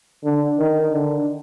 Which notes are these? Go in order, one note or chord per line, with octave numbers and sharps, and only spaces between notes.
D3
D#3
D3